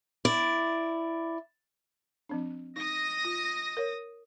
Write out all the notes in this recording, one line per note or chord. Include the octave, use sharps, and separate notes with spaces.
E4 D5
F3 C4 D4
D#4 D#5 D#6 A#6
F4
A#4 C#5